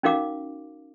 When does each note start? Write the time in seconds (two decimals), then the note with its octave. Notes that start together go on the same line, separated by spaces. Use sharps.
0.03 C#4 D#4 F#4 A#4 F5 D6